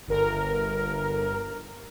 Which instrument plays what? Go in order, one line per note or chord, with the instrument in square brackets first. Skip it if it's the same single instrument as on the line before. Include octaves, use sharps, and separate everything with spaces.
[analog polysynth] G1 A#4